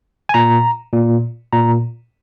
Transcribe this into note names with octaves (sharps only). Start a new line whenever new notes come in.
G#5
A#2 A#5
A#2
A#2 A#5